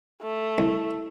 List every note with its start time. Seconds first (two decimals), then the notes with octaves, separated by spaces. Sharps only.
0.22 A3
0.58 C2